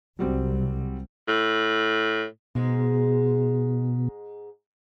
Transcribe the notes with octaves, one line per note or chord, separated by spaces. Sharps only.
C2 F#3 G3 C4
A2
G#2 B2 G#3